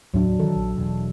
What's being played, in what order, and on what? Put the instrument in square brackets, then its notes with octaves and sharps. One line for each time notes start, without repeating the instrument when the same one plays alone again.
[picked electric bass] D#2 A2 [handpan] F#3 D4
[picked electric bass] D#3 E3 [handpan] A4
[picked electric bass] A#1
E1 E2